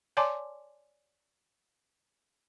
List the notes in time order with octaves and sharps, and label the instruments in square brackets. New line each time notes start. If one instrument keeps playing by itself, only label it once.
[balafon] C#5 D5 G#5 A5 C6 D6